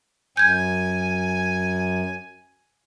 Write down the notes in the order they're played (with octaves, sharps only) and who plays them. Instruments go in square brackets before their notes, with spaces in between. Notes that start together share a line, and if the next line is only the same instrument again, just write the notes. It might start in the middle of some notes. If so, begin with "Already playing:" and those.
[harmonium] F#2 [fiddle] G#5 [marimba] G6 G#6